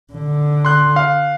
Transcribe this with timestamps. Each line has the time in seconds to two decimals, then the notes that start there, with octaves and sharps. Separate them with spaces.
0.13 D3
0.65 C6 F#6
0.96 F5